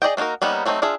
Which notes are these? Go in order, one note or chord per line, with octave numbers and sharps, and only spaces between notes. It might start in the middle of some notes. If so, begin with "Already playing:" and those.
G#4 D5 D#5 G5
A#3 D4 D#4 F#4 A#4
G3 A#3 B3 C#4 D#4
F#3 A3 C4 D4 D#4
D4 F4 G#4 E5